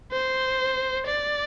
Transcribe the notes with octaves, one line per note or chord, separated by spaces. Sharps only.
C5
D5